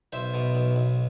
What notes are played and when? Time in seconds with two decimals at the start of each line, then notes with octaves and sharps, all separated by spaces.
0.12 B1 C5 E5
0.34 B2
0.55 B1
0.76 B1